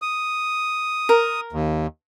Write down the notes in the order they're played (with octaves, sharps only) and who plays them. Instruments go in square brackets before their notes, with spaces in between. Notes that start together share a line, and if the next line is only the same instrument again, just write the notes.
[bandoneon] D#6
[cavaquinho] A#4
[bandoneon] D#2